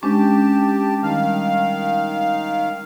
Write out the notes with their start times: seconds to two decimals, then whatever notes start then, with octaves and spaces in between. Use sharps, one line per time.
0.03 G#3 C#4 D4 G4 A5
1.03 D#3 G3 F5